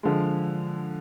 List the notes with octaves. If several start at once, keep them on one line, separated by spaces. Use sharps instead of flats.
D3 F3 G#3